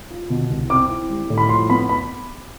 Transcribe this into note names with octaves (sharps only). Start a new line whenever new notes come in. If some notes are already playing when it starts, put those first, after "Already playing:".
F4
B2
C2
C4 D6
E4
G3
A2
B5
F3 C6
B3 B5
B5